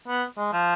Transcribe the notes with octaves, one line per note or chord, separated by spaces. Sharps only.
B3
G#3
F3